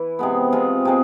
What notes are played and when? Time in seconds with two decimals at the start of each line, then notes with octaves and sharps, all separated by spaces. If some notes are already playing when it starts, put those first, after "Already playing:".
Already playing: E3 E4
0.19 C3 G#3 B3
0.52 C3 G#3 C4 F4
0.85 C3 G#3 C4